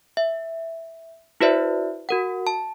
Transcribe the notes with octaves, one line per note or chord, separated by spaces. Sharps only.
E5
E4 F#4 B4 C5 D5 E5
F#4 A#4 F#5
A5